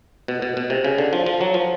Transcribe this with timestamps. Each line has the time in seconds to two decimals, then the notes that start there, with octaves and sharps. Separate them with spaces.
0.28 B2
0.42 B2
0.57 B2
0.70 C3
0.84 C#3
0.98 D3
1.13 F3
1.26 F3
1.41 F#3
1.54 F3